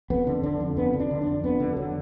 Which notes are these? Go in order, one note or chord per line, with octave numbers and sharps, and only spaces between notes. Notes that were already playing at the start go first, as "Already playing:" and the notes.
F2 B3
D3
D3 D4
F2
F2 B3
D3
D4
D3
D4
F2
F2 B3
D3
D3 F#3